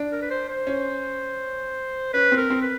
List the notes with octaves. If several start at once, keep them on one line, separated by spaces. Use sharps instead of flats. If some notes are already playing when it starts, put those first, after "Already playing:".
Already playing: D4
A#4
B4
C5
C5
C#4
C#4 B4
C4
A#4
C4
B4